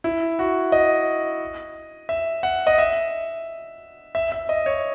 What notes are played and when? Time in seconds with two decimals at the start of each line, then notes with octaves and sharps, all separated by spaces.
0.04 E4
0.39 F#4
0.72 D#5
2.09 E5
2.43 F#5
2.67 D#5
2.78 E5
4.15 E5
4.32 E5
4.49 D#5
4.66 C#5